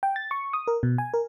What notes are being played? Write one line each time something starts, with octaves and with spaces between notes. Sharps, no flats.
G5
A6
C#6
D#6
A#4
B2
G#5
A#4